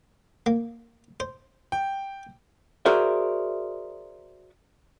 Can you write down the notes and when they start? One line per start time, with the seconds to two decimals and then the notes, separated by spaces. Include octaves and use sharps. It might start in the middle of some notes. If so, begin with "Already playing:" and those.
0.46 A#3
1.20 C5
1.72 G5
2.86 F#4 G#4 A#4 C5 D5 E5